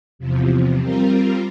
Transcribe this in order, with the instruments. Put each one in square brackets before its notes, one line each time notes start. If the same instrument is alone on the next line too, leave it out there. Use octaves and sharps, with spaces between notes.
[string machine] E2 C3 F3
G3 C4 F4 A#4